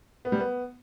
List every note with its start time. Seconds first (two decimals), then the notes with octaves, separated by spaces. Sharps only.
0.25 B3
0.32 G3
0.39 B3